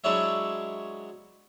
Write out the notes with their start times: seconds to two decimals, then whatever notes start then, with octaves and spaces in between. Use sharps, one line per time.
0.04 F#3 G#3 D4 E4 C#5 E5